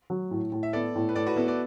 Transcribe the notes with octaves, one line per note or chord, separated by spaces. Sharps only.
F#3
A2
A2
E5
B3 A4 D5
A2
B4
A2 A4 D5
F#4 B4
B3 E4 A4
A4 D5